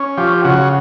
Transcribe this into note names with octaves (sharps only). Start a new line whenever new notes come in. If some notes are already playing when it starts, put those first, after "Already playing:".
Already playing: C#4
F3 G4
C#3 F#4